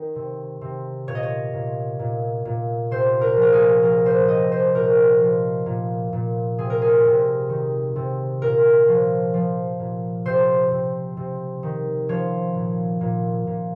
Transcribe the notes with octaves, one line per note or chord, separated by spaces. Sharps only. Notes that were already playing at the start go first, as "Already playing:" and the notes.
Already playing: D#3
C3
C3
A#2 C#5
D#5
C#5
A#2
A#2
A#2
C3 C5
A#4
F3
A#4
G#4
F3 A#4
C5
C3 D#5
C5
A#2 A#4
F3
A#2
A#2
C3 G#4
A#4
G#4
C3
D#3
C3
A#2 A#4
F3
F3
A#2
C3 C5
C3
C3
D#3
F3 C#5
A#2
A#2
A#2